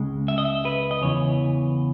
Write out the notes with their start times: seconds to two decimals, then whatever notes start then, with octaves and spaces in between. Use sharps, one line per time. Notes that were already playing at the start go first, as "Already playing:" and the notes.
Already playing: C#2 C#3 G#3
0.28 E5
0.38 D#5
0.45 E5
0.65 B4
0.91 D#5
1.02 E2 C#3 E3 C#5